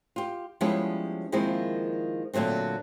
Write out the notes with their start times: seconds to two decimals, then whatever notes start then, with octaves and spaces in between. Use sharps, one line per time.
0.16 F4 G4
0.61 F3 G3 G#3 B3 C#4 E4
1.32 D#3 F3 G#3 A#3 C4 E4
2.33 A#2 D3 F#3 A3 C4